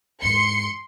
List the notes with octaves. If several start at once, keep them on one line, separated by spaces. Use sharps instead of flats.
E2 G#2 C6 C#7